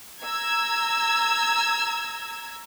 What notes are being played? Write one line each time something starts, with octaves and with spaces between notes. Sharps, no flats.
A#5 E6 G#6